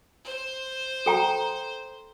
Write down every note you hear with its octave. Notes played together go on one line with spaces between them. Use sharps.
C5
A4 G5 A#5